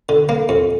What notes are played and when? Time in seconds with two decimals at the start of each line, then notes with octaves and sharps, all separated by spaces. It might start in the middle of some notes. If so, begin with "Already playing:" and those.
0.09 D3
0.29 A#3
0.49 F2